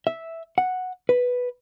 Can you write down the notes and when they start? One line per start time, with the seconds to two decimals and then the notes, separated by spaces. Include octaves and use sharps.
0.07 E5
0.58 F#5
1.09 B4